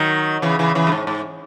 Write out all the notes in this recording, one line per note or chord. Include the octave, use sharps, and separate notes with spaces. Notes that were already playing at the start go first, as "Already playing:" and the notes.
Already playing: D#3 F#3
C#3 E3
C#3 E3
C#3 E3
F#2
G#2
G#2